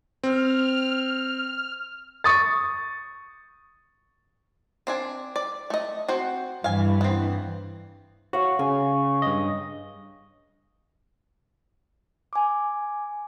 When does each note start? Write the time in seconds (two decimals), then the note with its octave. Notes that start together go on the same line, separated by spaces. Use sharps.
0.24 C4 F6
2.24 C#6 D#6 A6
4.87 C4 D4 G#5
5.36 D5
5.70 A3 D#5
6.08 C4 F#4 C5
6.64 G2 E3 F5 G#5
7.01 B3 C4
8.33 F#4 C#5 F5
8.59 C#3 G#5
9.22 G2 D#5
12.33 G#5 D6